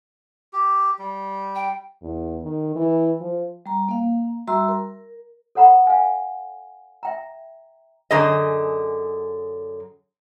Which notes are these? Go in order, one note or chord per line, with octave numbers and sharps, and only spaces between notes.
G4
G3
G5
E2
D#3
E3
F3
G3 A#5
A#3 F5
G3 F#4 E5 A#5 C6 E6
A#4
A4 C#5 F#5 A#5 B5
F5 G#5
E5 G5 A#5
F#2 D3 G#4 D#5